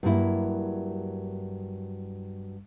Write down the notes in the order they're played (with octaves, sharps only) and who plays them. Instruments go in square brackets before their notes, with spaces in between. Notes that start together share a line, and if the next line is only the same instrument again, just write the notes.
[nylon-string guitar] G2 F#3 G3 A#3 E4